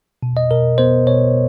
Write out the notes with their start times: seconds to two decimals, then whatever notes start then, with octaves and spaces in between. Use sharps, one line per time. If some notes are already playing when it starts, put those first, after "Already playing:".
0.23 B2
0.37 D#5
0.51 B2 A#4
0.78 B3 C5
1.07 B2 C#5